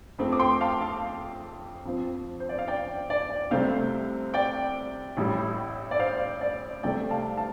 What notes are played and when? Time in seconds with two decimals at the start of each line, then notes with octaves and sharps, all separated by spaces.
0.19 F2 F3 A3 C4
0.33 D6
0.39 G5 C6
0.61 F5 A5
0.81 F5 A5
1.85 F2 F3 C4
2.40 C5
2.49 D5
2.59 F5
2.68 D5 G5
3.10 D5
3.30 D5
3.51 C2 C3 A3 C4 C5 F5
4.34 D5 G5
5.17 A1 A2 G3
5.91 D5
6.00 C5 F5
6.41 D5
6.83 C2 C3 A3 D5 G5
7.10 F5 A5
7.37 F5 A5